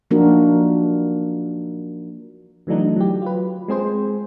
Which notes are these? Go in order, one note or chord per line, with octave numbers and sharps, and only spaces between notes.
F3 A#3 D4 D#4 F#4 A#4
D3 E3 F#3 A3 D4 D#4
F#3 G4
F4 B4
G#3 C4 G#4 C5